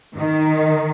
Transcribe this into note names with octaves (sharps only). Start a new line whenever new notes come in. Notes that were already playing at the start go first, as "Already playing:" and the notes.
D#3